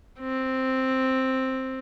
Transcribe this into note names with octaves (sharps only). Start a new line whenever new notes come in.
C4